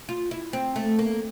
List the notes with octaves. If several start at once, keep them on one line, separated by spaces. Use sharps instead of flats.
F4
E4
C4
A3
A#3